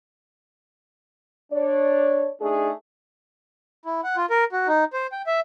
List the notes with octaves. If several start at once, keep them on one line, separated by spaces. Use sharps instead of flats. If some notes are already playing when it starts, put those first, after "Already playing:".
D4 C#5 D5
A3 D4 D#4 G#4
E4
F#5
F4
A#4
F#4
D#4
C5
G5
E5